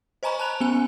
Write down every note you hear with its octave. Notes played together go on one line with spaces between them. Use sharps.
C5 D#5 G#5 A#5 B5 C#6
A5 B5 F#6 F7
B3 C#4 G#5